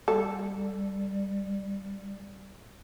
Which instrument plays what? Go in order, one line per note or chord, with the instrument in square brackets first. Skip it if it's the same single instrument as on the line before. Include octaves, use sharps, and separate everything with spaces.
[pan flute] G3 [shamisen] A4